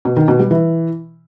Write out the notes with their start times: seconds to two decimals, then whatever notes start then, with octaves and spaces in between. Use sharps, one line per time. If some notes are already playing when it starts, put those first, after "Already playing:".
0.05 B2
0.16 D#3
0.28 B2
0.39 G3
0.51 E3